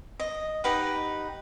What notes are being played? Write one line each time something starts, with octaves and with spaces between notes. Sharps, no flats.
D#5
D#4 G4 B4 F#5